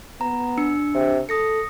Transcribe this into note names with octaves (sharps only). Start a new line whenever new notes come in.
B3 A#5
D4 E6 C#7
C3
A4 D#6 A#6 C#7